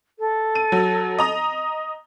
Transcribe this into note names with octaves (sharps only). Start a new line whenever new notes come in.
A4
D#7
F#3
D#5 A#5 D#6